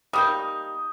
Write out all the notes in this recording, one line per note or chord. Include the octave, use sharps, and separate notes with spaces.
G3 A#3 D#4 D#6 G6